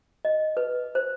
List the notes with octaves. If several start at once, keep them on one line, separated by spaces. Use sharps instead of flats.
D#5
B4
C5